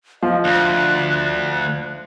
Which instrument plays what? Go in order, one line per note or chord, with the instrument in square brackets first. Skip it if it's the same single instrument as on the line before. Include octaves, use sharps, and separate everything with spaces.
[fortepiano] F3 [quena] D#5
[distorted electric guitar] D2 [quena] F#6